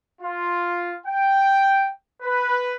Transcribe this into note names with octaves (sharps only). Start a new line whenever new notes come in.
F4
G5
B4